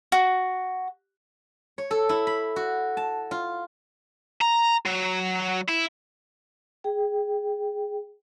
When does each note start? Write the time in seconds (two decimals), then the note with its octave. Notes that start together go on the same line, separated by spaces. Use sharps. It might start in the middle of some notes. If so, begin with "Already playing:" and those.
0.12 F#4
1.78 C#5
1.91 A4
2.09 E4
2.27 B5
2.56 F#4
2.97 A5
3.31 F4
4.42 A#5
4.86 F#3
5.68 E4
6.84 G#4 G5